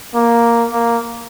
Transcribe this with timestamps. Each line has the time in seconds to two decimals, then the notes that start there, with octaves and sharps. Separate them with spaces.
0.14 A#3
0.72 A#3